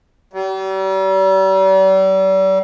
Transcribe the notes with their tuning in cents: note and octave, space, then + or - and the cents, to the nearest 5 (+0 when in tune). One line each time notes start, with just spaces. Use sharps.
G3 -40